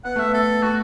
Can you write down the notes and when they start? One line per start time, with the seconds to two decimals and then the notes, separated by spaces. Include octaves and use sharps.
0.04 B3 F#5
0.16 A3 E5
0.26 B3
0.34 A4
0.63 A3 F#4